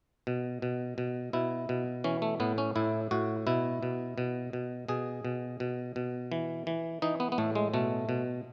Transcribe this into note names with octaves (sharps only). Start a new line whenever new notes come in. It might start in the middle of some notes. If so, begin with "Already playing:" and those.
B2
B2
B2
B2 E4
B2
E3 C#4
A3
A2 B3
C#4
A2 E4
A2 F#4
B2 E4
B2
B2
B2
B2 G#4
B2
B2
B2
E3
E3
E3 D#4
B3
B3
A2 A3
G#3
B2 A3
B2